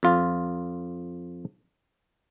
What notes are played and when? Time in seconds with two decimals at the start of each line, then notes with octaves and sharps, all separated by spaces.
0.03 F2 F4